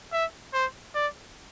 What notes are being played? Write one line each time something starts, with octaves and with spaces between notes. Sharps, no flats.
E5
C5
D5